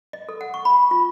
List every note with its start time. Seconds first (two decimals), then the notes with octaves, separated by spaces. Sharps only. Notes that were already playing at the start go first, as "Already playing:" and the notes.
0.13 D#5
0.29 A4
0.41 F#5
0.54 C#6
0.65 B5
0.91 F4